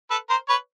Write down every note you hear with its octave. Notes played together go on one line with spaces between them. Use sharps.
A4 B4
A#4 C5
B4 C#5